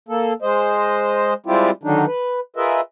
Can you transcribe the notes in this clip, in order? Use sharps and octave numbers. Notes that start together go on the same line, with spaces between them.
A#3 A4
G#3 C5 D#5
G3 G#3 C4 E4 F4 G4
D3 D#3 F#3 D4 D#4
B4
F4 G#4 A#4 B4 D#5 E5